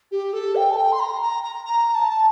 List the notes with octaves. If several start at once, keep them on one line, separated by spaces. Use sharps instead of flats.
G4
A4
G5
A5
G5
C6
A#5
A#5
A#5
A#5
A5